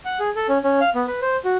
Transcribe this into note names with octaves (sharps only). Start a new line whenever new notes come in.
F#5
G#4
A4
C#4
C#4
F5
B3
B4
C5
F#4